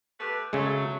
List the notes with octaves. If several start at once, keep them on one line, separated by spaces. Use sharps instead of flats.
A3 G4 B4
C#3 F#3 G#3 A3